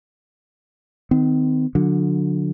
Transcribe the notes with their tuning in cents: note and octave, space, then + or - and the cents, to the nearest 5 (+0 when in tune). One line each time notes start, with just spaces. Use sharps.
D#3 +0 C4 -40
D3 +0 F#3 -35